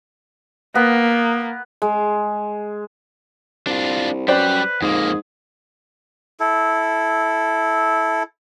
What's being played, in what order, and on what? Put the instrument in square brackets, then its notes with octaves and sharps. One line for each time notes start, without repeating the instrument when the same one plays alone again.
[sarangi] A#3 [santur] B3
[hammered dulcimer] G#3
[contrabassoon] C2 [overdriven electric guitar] D4 F4
[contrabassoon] F#2 [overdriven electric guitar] G3 G5 [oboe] B4 [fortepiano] C5 D5
[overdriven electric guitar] F2 A#3 [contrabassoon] G#2 [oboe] G#4
[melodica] E4 A4